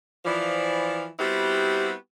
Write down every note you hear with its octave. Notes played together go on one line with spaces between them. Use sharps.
E3 F3 D5
G3 B3 C4 E4 F#4 G4